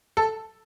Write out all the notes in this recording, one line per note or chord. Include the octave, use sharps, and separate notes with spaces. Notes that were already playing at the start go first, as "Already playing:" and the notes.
A4